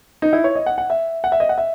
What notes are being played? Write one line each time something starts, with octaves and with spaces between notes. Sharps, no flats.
D#4
E4
C#5
D#5
F#5
F#5
E5
F#5
E5
D#5
F#5
E5